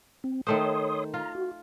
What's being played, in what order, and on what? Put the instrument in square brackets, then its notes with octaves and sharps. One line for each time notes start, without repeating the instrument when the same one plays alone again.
[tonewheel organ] C4
[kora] D#3 A3 C5 [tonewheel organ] C#5 C6 D#6
[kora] F4 [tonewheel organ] A#5
[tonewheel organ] F#4